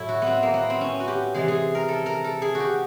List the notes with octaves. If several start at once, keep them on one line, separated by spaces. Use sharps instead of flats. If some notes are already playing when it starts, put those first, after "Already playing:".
Already playing: A2 F#3 E4
F#4
B3 C4
A#3
B3
C4
C#4
F#4
G4
C3 E3 G#3 G#4
G#4
A#4
A4
A#4
A4
G#4
F#4
G4